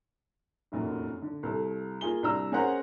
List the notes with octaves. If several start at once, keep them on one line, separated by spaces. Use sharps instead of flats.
F1 F#2 A#2
D3
C2 A4
A#3 F4 G#4 G7
C2 D4 A#5 E6
C#4 G#4 A#4 C5 F#5 A#5